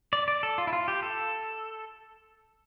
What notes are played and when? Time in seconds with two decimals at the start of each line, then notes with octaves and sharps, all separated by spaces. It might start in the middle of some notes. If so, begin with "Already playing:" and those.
0.13 D5
0.28 D5
0.43 A4
0.58 F4
0.67 E4
0.73 F4
0.88 G4
1.03 A4